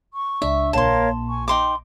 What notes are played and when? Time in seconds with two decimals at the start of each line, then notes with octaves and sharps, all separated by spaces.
0.14 C#6
0.42 C#2 D4 E5
0.73 A#1 A#2 A#3 A#4 C#5 F5 A5 C6
1.29 G#5 C#6
1.48 D#4 G5 C6 D6